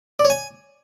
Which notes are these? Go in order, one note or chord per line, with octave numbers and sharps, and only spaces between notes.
D5
C#5
G#5